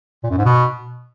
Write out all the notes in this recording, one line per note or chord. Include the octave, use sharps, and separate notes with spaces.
A#2
F#2
G#2
B2